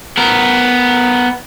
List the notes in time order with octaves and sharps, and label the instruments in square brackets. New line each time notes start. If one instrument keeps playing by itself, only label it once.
[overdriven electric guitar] B3 A#4